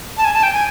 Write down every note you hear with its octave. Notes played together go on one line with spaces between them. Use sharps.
A5
G#5
A5
G5
G#5